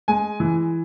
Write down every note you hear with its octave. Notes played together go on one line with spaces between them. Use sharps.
G#3 G#5
E3